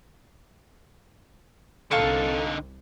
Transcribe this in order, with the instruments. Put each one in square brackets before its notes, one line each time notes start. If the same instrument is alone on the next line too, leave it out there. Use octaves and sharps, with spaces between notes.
[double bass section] C2 [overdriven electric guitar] D3 D#4 [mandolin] F4 A5 C#6 [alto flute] A4